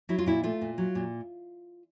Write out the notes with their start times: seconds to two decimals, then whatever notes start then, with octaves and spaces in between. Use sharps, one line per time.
0.09 F#3 E4
0.18 F4
0.26 A#2 E4
0.43 A3 F4
0.61 A#2
0.78 F#3
0.95 A#2